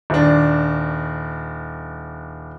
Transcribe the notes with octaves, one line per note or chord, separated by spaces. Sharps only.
D#1 D4